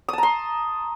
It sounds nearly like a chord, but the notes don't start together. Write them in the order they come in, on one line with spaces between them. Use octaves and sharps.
D#6 A5 A#5 C6